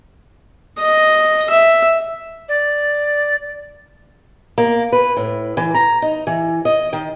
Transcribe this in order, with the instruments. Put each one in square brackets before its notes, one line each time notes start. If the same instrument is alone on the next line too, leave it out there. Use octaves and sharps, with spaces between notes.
[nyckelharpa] D#5
E5
[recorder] D5
[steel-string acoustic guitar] A#3
B4
A2
E3
A#5
D#4
E3
D#5
D#3